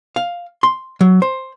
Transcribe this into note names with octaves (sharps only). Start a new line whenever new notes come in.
F5
C6
F#3
C5